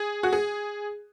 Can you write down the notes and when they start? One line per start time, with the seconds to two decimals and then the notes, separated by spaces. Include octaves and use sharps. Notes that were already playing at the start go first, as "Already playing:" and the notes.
Already playing: G#4
0.23 F#4
0.33 G#4